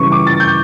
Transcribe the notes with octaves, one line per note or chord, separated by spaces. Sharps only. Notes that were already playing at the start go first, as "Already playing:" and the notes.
Already playing: C#3 E3 G3 C#4 C#6
D6
A6
G6